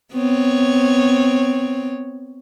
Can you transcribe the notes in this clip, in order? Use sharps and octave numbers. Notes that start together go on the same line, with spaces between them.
B3 C4 C#5